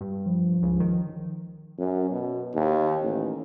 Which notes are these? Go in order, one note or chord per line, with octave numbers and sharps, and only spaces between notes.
G2
F3
C#2
D#3
F#2
B2
D#2
A1